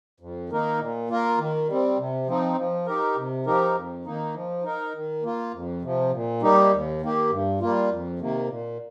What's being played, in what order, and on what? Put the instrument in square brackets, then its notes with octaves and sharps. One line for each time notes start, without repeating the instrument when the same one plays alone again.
[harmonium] F2
D#3 A#3 D#4 A#4
A#2
A#3 F4 A#4
D#3
G3 C4
C3
F3 C4 D#4
F3
D#4 G4 A#4
C3
F3 D#4 G4 A#4
F2
D#3 A#3 D#4
F3
D#4 A#4
D#3
A#3 F4
F2
C3 F3
A#2
G3 A#3 D#4 G4
D#2
D#3 A#3 G4
G2
G3 A#3 F4
F2
C3 D#3 A#3
A#2